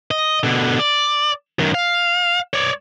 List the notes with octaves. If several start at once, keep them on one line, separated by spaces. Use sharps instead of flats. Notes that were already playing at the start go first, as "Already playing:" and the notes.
D#5
B2 D3
D5
F#2 D#3
F5
C#5 D5